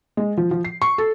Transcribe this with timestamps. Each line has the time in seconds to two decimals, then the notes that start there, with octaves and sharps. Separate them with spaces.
0.17 G#3
0.37 F3
0.51 F3
0.65 C7
0.82 C#6
0.98 A4